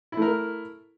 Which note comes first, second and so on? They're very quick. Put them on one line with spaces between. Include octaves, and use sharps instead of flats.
E4 A3 A#4